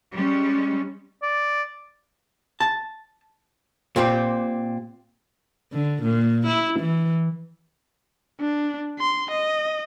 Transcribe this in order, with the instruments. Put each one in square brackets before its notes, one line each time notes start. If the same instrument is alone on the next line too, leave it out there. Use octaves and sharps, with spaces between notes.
[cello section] G3 G#3 C#4
[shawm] D5
[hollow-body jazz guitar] A5
A#2 C4 G4
[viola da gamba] D3
A#2
E4
E3
[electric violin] D4
C6
D#5